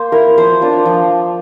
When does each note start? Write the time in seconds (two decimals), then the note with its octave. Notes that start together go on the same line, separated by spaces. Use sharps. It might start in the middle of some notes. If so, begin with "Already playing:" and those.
Already playing: A#3 C5
0.12 E4 A#4
0.38 F3 C5
0.61 A#3 D4 F4
0.86 F3